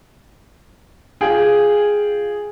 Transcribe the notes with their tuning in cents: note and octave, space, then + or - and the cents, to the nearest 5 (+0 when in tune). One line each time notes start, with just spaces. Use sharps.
F4 +0 G#4 +0 G5 +0